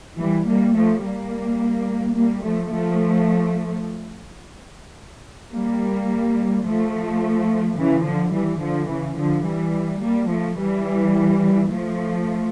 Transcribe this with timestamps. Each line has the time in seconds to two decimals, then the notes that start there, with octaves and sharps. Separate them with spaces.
0.18 E3 G3
0.46 G3 A#3
0.75 F3 A3
1.02 G3 A#3
2.15 G3 A#3
2.43 F3 A3
2.71 F3 A3
5.52 G3 A#3
6.64 F3 A3
7.77 C#3 E3
8.05 D3 F3
8.33 E3 G3
8.61 D3 F3
8.89 C#3 E3
9.18 D3 F3
9.46 E3 G3
10.02 G3 A#3
10.30 F3 A3
10.59 E3 G3
11.71 F3 A3